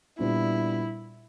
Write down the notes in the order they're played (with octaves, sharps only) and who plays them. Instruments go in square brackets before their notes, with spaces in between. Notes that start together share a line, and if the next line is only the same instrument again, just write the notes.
[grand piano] A#2 G3 B3 D4 F4 [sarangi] E4